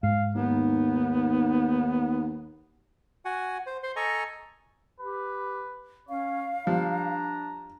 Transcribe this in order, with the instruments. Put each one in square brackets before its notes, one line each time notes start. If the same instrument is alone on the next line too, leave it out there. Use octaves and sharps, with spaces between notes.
[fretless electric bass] G#2 [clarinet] F5
[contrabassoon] D#2 [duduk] B3 [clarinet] D#4
[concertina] F#4 F#5 G#5
C5
C5 C6
A4 D#5 G#5 A#5 C#6
[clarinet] G4 [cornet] B4
[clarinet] C#4 [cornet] C#5 [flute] F5
[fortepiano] F3 G3 [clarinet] D4 [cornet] A#5